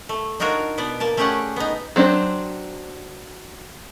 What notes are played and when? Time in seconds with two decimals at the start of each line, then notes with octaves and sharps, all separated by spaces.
0.09 A3
0.40 D4 D#4 F4 F#4 A#4 C#5
0.78 B2 B3 D5
1.00 A#3 A#4 A5
1.17 A3 C#4 G4 G#4 D5 F#5
1.56 B3 D#4
1.96 F#3 C4 D4 A4 C5